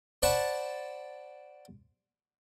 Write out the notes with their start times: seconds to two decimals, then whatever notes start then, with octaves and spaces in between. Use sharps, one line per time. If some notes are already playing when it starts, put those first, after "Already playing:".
0.22 C5 D5 F#5 A5 B5 C#6